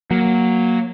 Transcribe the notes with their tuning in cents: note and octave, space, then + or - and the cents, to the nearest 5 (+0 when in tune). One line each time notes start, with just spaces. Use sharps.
F#3 +0 A#3 +0